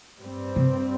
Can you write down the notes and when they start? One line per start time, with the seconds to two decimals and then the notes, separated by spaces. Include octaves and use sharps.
0.20 G2 G3 C4
0.56 C3